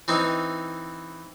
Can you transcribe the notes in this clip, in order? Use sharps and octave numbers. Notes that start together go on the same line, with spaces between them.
E3 C4 D#4